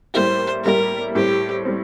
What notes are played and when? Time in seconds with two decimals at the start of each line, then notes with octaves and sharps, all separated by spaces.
0.14 A2 G3 A#3 E4 G4 C5
0.64 A2 G3 A#3 E4 G4 A#4
1.15 A2 G3 C4 G4
1.65 G3 C4